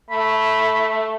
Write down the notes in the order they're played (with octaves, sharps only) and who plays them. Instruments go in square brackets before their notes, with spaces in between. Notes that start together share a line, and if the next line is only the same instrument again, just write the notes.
[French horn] A3 [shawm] B5